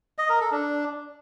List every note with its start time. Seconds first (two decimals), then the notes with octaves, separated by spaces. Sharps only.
0.18 D#5
0.29 A#4
0.41 A4
0.52 D4